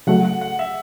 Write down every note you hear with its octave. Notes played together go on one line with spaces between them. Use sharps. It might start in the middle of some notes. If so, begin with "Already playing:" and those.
C#3 F#3 A3 F#5
F#5
F#5
E5